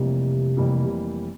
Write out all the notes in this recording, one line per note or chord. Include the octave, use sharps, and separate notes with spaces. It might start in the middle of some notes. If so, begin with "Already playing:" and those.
Already playing: F1 F2 C3 E3 G3 A#3
F1 F2 E3 G3 A#3